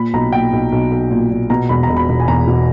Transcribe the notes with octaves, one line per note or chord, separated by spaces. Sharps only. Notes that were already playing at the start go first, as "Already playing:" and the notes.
Already playing: A#2 B5
B1 A#5
A#2 G5
B1
B1
B1
A#2
A#2
B2 A#5
E1 B5
A#5
E1
B5
E1
G#5
E2 A#5
B2